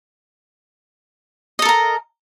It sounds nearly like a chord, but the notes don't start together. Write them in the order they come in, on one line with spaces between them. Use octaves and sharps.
D#5 A4 A#4 A#5